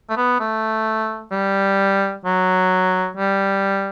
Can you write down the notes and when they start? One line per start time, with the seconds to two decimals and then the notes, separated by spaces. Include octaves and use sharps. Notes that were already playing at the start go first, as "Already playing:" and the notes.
0.09 A3
0.17 B3
0.40 A3
1.31 G3
2.25 F#3
3.17 G3